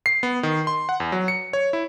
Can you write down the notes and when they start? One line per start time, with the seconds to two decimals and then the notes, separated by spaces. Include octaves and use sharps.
0.06 C7
0.23 B3
0.43 D#3
0.67 C6
0.89 F#5
1.00 E2
1.12 F#3
1.28 C#7
1.53 C#5
1.73 E4